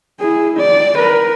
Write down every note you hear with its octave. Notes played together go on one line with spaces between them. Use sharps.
E4 G#4
D5
A#4 B4